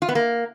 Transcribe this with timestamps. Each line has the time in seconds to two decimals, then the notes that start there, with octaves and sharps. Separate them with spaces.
0.02 F4
0.09 B3
0.15 A#3